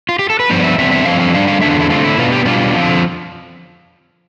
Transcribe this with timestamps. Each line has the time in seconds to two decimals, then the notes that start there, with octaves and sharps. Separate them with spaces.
0.09 F4
0.19 G4
0.30 A4
0.40 B4
0.50 G2 F3 B3 D4 C5
0.60 D5
0.64 E5
0.78 E2 D3 G3 C4 E5
0.91 E5
1.06 G2 F3 A3 C4 F5
1.20 F5
1.33 D3 G3 D4 F5
1.48 F5
1.61 E2 D3 F3 A3 D4 E5
1.71 F4
1.80 E4
1.90 D3 A3 C4 F4
2.05 E4
2.18 B2 B3 D4 F4
2.32 G4
2.45 B2 G3 D4 F4
2.74 D3 F3 C4